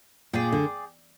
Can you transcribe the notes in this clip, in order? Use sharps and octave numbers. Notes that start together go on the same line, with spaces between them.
A#2 G#4 D5 G5
D3